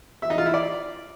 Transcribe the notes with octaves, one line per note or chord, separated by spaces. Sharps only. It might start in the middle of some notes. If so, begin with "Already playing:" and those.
E5
D#4
F4
E4
D5